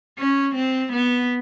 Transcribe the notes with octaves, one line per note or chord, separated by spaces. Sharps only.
C#4
C4
B3